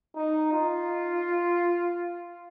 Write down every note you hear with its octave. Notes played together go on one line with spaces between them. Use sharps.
D#4
F4